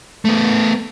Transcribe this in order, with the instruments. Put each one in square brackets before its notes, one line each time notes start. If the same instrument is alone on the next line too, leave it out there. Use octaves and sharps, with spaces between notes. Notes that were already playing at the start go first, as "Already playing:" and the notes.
[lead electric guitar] A3 B3